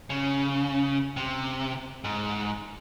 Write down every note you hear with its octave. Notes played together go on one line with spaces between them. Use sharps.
C#3
C3
G#2